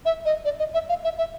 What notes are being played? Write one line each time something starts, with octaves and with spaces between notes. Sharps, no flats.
E5
D#5
D5
D#5
E5
F5
E5
E5